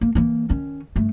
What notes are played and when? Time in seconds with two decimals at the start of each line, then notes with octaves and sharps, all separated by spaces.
0.01 A#3
0.15 E3 A#3
0.50 D#3 C#4
0.96 G2 A3